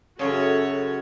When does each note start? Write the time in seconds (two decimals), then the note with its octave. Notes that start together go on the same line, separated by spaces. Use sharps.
0.19 F#2 A2 C#3 F#4 A4 C#5